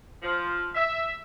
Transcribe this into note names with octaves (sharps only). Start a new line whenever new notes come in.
F3
E5